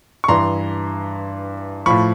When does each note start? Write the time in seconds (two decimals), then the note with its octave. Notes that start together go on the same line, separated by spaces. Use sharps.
0.24 C#6
0.28 G2 E3 A#5 C6
1.86 A2 F3 B5 C#6